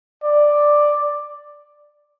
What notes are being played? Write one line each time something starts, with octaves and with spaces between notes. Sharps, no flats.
D5